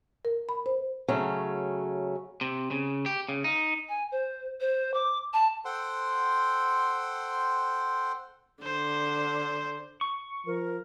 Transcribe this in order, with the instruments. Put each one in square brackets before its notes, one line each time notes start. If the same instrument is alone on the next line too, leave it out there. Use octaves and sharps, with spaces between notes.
[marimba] A#4
B5
C5
[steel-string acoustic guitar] C#3 F#3 A3 C#4
[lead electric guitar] C3
C#3
G4
C#3
D#4
[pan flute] G#5
C5
C5
D6
A5
[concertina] A4 C5 F#5 G5 C6
[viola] D3 [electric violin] C5
[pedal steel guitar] C#6
[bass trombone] F3 [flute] A#4